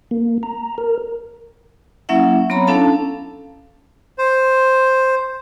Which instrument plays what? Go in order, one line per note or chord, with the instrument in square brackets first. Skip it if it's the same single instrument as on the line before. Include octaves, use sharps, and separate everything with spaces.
[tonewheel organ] A#3
A#5
A#4
[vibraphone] F#3 A#3 C#4 E4 E5 F#5
F#3 B3 C4 C#5 A#5 B5
C#4 D4 E4 A4 F5 A5
[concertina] C5